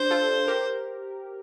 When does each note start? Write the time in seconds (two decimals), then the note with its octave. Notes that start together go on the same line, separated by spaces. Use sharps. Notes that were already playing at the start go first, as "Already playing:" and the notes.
Already playing: D4 G4 C5
0.10 F4 A4
0.47 G4 A#4